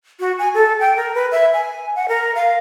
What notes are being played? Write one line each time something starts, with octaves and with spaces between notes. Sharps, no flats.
F#4
G#5
A4
G5
A#4
B4
E5
G#5
F#5
A#4
F5